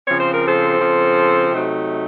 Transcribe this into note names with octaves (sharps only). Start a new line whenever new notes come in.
C#3 F3 C4 C#5
C5
A#4
A4 C5
C#3 F3 C4
C3 F#3 A3 D#4